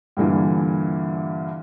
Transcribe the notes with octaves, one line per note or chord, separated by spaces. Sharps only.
G2 A#2 D3 E3